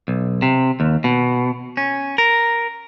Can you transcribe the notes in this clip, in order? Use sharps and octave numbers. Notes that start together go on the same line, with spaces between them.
B1
C3
D#2
B2
C#4
A#4